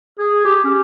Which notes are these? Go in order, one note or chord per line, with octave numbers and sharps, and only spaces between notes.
G#4
G4
C#4